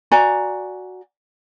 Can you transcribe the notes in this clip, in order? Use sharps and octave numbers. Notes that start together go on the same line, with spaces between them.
F#4 D5 G#5 A#5